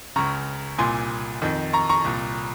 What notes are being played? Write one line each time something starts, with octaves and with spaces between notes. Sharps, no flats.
C#2 C#3 A#5 C#6
C2 A#2 G#5 C6
F2 D#3
A#5 C#6
A#5 C#6
C2 A#2